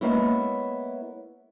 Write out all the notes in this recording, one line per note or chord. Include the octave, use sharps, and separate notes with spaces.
G#3 A#3 B3 C#4 E4